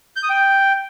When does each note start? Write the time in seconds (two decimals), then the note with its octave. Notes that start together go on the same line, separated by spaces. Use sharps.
0.16 G6
0.23 D#6
0.30 G5